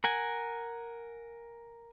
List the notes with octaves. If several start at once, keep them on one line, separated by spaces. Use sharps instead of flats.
A#4 F#5 G#5